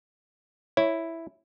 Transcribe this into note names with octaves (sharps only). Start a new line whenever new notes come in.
E4 C#5